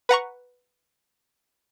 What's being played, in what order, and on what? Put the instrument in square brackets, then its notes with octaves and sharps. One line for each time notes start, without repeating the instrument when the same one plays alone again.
[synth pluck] B4 F#5 A#5 C#6